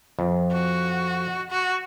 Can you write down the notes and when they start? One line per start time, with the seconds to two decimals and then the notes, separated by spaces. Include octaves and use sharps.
0.19 F2
0.52 F#4
1.50 F#4